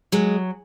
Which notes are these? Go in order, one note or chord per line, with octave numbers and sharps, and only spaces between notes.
F#3 G#3